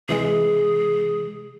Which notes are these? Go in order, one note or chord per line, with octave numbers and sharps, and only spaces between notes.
C3 E3 G#3 G#4